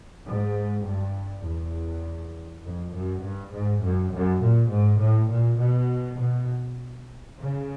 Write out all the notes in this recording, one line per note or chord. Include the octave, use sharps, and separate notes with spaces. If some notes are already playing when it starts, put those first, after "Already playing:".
G#2
G2
E2
F2
F#2
G2
G#2
F#2
F#2
A#2
G#2
A2
A#2
B2
B2
C#3